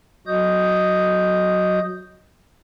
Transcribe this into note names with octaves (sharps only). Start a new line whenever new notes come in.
F#3 F#4 D#5 D#6 G6